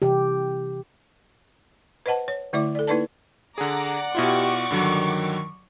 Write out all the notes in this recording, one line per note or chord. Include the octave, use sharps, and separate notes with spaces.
C3 E3 G4
B4 C5 D#5 F#5 A5
C#5
D3 A3 E4 D5 E5 D6
A4 D5
A#3 D#4 E4 B4 D5 A5
D3 G#4 D5 F#5 A#5 D6
B2 E4 F4 G4 C#6 D6
G2 D3 D#3 F#3